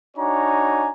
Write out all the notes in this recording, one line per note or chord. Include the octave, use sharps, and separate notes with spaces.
D4 D#4 F#4 C#5 G#5 A#5